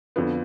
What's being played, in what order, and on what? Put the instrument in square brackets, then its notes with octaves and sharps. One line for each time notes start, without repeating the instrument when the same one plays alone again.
[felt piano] F2 D3 F3 B3